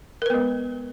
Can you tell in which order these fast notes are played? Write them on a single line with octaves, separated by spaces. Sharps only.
A#4 B4 B3 G#3